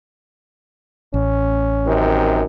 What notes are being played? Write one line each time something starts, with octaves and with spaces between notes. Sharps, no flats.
A1 C#4
F#2 C3 D#3